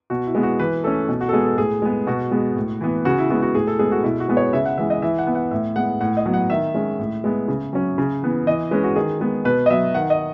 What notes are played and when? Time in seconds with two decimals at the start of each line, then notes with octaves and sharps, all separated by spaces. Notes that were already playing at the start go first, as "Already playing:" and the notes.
0.10 B2 F#4
0.26 E4
0.35 G#3 B3
0.43 F#4
0.59 E3 B4
0.84 A3 C#4 A4
1.09 B2
1.21 F#4
1.29 A4
1.33 G#3 B3 G#4
1.46 A4
1.58 A2 G#4
1.82 G#3 B3
2.07 B2 F#4
2.32 G#3 B3
2.56 A2
2.81 E3 B3
3.05 C#3 F#4
3.18 E4
3.30 G#3 B3 F#4
3.42 F#4
3.55 A2 G#4
3.67 A4
3.79 G#3 B3 G#4
3.92 F#4
4.04 B2 E4
4.20 F#4
4.28 G#3 B3
4.37 C#5
4.53 C#3 E5
4.65 F#5
4.78 E3 G#3 E5
4.90 D#5
5.02 E3 E5
5.18 F#5
5.27 B3
5.35 F#5
5.51 A2 E5
5.76 G#3 B3 F#5
6.01 A2 F#5
6.17 D#5
6.26 F#3 B3
6.34 F#5
6.50 D#3 E5
6.75 G#3 C#4
6.99 A2
7.24 G#3 B3
7.48 C#3
7.73 F#3 C#4
7.98 C#3
8.23 E3 B3
8.47 E3 D#5
8.71 G#3 C#4 B4
8.84 F#4
8.96 D#3 G#4
9.21 G#3 B3
9.45 B2 B4
9.66 D#5
9.70 F#3 B3 E5
9.94 D#3 F#5
10.10 D#5